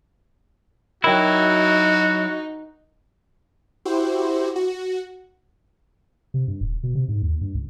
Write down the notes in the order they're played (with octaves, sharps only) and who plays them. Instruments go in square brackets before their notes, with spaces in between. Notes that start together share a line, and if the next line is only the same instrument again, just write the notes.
[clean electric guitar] F#3 E4 [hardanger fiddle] D#4 [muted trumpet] F#4 [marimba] A#4 G5
[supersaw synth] E4 F#4 G4 C5
F#4
[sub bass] C3
G2
D#1
B2
C3
G#2
D#2
G2
C#2